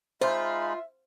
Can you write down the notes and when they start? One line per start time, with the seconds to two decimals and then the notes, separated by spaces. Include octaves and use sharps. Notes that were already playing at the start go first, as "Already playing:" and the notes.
0.21 G#3 D#4 F4 C5 E5 B5